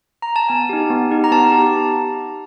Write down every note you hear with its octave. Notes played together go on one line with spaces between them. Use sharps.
A#5
A5
B3 G#5
D#4 G4
B3
D#4 G4
A#5
B3 A5
D#4 G4